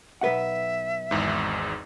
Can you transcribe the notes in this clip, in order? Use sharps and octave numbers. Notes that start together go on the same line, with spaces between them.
B1 B4 E5 F#5
G#1 E2 G#2